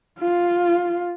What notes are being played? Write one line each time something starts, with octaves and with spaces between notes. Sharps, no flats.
F4